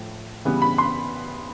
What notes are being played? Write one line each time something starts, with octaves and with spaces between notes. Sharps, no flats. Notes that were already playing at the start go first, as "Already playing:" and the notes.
Already playing: A2 F3 A3
C#3 E3 G3 B3
B5
C6